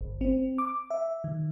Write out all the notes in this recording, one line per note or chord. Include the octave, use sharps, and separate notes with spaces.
G1
C4
D6
E5
D#3